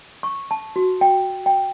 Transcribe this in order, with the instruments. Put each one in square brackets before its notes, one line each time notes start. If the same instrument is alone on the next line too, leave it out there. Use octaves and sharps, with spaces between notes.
[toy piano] C#6
A5
F#4
G5
G5